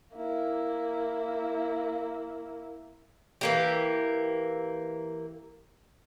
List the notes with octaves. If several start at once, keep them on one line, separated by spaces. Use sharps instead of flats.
A#3 E4
E3 A#3 G4